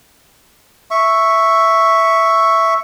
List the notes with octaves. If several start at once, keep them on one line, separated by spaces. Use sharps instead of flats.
E5 C#6